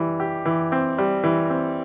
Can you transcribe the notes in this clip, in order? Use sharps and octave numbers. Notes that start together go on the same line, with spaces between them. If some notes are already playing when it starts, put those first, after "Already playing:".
Already playing: E3 G3
G4
E3
C4
G3
E3
C4